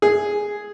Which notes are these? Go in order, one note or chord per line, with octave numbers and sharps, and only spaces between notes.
G#4